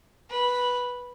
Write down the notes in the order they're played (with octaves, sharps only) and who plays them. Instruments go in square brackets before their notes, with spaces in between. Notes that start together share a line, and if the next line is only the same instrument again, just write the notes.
[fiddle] B4